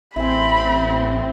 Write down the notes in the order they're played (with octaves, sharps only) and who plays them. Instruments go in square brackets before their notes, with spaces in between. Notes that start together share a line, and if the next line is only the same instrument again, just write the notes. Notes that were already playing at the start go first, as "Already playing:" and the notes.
[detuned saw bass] A1 [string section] C4 [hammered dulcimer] E4 G#5 [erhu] B5